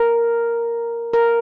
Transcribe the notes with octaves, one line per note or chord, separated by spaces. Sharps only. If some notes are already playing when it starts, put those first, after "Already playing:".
Already playing: A#4
A#4